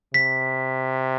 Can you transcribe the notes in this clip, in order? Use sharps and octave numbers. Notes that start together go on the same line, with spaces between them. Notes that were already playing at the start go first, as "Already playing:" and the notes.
C3 B6